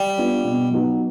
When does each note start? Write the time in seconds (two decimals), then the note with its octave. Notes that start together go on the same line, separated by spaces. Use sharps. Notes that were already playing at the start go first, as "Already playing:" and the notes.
Already playing: G3
0.18 B3 D4 F4
0.44 B2
0.71 F#3 B3 D#4 F#4